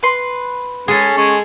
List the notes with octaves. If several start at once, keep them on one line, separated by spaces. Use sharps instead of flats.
B4 C6
G#3 C#4 G#4 A4
G#3 C#4 G#5